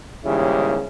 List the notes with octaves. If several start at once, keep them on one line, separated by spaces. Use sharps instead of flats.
D#2 G#2 C#3 G3 E4